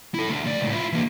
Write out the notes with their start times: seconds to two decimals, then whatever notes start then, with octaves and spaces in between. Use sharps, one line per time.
0.14 E4 A4
0.29 D3 A3
0.44 C#2 D5
0.61 C#2 A2
0.73 E4 F4
0.92 E3 A#3